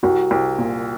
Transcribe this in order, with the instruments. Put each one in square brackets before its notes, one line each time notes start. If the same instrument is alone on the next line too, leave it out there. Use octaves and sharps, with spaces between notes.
[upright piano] C2 [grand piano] F#4
[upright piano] C2
A#2